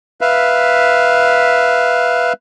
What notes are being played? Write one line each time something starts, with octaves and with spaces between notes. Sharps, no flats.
B4 E5 F5